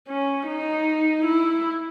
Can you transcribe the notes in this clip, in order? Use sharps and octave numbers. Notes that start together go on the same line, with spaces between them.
C#4
D#4
E4